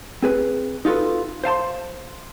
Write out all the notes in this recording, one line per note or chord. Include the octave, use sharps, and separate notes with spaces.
C4 G#4 B4
D#4 F4 F#4 A4 B4
C5 F5 A5 C6